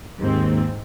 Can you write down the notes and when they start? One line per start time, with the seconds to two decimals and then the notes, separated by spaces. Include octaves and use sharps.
0.19 D#2 G#2 C4